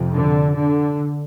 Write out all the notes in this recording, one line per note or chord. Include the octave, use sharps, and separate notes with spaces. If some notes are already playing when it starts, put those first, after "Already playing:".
Already playing: F2 C3
D3
D3